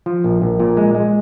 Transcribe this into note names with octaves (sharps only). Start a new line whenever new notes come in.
F3
A#1
A#1
A#2
G#3
G#3